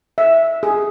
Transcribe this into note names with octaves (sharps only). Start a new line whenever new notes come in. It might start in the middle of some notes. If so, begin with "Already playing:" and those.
E5
G#4